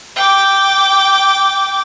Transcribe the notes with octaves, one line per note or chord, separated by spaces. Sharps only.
G5 D6